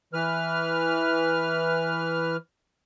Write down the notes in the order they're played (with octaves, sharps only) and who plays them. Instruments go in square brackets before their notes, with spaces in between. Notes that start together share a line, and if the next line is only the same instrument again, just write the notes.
[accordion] E3 B4 F6